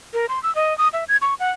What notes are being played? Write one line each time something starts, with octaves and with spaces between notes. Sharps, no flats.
A#4
C6
E6
D#5
D#6
E5
G#6
C#6
F#5